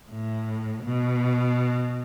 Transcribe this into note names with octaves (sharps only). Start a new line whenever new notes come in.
A2
B2